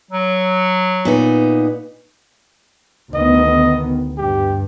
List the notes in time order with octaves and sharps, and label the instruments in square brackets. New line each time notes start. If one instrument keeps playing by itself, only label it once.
[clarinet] F#3
[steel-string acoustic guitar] A#2 B3 D#4
[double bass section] D2 D#3 B3 [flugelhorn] D#5
[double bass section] G2 [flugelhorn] G4